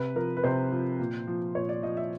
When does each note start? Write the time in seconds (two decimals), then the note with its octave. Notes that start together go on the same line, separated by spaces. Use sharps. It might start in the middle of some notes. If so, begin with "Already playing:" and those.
Already playing: C3 B4
0.16 F3 A#4
0.37 B4
0.43 C3 C5
0.72 F3
1.00 A#2
1.27 F3
1.55 A#2 C#5
1.69 D5
1.83 F3 D#5
1.97 E5